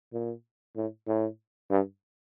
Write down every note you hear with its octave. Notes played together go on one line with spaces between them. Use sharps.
A#2
A2
A2
G2